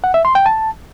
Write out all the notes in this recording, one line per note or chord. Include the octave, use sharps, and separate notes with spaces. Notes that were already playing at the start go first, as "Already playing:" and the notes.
F#5
E5
C6
G5
A5